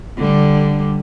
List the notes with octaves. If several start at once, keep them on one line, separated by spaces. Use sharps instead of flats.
D3 G3